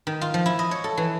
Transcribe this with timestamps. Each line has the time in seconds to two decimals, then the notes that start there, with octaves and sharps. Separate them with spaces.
0.07 D#3
0.21 F4
0.34 F3
0.46 E4
0.59 D#5
0.71 C#5
0.84 A4
0.97 E3